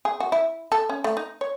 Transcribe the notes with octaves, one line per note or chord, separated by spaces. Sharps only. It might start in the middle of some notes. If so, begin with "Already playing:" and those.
G#4
F#4
E4
A4
C#4
A3
D#4
C#5